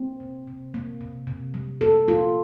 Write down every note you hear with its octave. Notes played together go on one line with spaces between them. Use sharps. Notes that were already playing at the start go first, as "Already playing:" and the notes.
Already playing: A#3 C4
C3
C3
A#3
C3
C3
G3
A#3 A4
A#3 F4